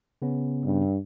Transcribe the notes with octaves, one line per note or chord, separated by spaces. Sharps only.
C#3 B3 C#4
G2